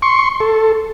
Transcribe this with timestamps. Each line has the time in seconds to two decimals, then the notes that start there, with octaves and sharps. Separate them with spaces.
0.02 C6 C#6
0.40 A4